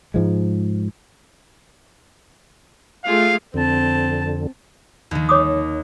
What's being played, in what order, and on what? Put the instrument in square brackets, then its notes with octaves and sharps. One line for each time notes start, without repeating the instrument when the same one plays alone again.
[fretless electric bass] G#2 F3 G#3
[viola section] A3 F4 G#4 [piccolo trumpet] F5
[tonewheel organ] F2 D3 [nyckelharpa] C4 A5
[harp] D#2 D#3
[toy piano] C#5 D6 D#6